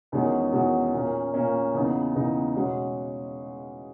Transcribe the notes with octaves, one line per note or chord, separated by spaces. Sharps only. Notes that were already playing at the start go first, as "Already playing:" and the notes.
E2 D#3 G#3 C#4 F#4
E2 D#3 G#3 C#4 F#4
A#2 A#3 C#4
A#2 A#3 C#4
E2 C#3 E3 B3 D#4
E2 C#3 E3 B3 D#4
B2 G#3 C#4 F#4